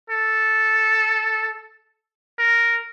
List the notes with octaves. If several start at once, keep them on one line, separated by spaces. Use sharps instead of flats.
A4
A#4